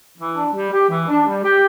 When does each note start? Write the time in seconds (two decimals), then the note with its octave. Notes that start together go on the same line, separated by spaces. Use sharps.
0.18 E3
0.35 D4
0.53 G3
0.71 G4
0.89 E3
1.08 D4
1.26 G3
1.44 G4